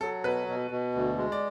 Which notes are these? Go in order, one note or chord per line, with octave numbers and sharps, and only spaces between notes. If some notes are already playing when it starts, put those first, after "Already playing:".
F#3 A4
B2 B4
B2
B2
D2
G#3
D5